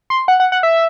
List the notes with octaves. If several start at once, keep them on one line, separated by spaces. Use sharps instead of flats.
C6
F#5
F#5
F#5
E5